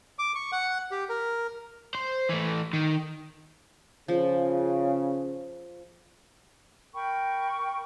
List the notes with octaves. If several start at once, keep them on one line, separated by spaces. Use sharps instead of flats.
D6
C#6
F#5
G4
A#4
C5
E3 A3
D#3
C#3 F3
A#4 G5 B5 C#6